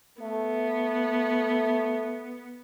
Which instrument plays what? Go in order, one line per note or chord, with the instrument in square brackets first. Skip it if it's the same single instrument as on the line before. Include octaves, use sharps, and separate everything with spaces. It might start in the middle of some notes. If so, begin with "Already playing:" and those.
[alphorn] A3 [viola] B3